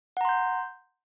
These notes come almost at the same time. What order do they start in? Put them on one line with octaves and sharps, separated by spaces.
F#5 A#5 C6 G6